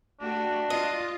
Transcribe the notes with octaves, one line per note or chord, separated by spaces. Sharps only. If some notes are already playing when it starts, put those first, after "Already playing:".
A3 D4 F#4 G4
F4 D#5